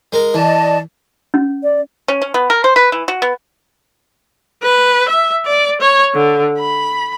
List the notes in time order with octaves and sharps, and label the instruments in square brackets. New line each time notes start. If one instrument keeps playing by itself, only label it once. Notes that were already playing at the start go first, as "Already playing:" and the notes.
[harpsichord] G#3 A#4
[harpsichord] E3 [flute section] D5 D#5 A5
[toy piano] C#4
[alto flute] D5
[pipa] C#4
C#4
B3
A#4
C5
B4
E3
F#4
B3
[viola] B4
E5
D5
C#5
D3
B5